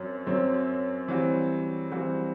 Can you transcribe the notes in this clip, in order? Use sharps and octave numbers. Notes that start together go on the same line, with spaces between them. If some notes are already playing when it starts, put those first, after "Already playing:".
Already playing: F#2 F#3 C4
F#2 F#3 C4
E3 G3 C4 F#4
E3 G3 C4 F#4